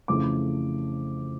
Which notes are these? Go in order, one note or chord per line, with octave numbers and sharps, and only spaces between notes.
F2 C#3 E3 A3 D6